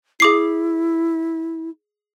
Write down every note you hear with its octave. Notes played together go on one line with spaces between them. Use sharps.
E4 G#4 D6 C7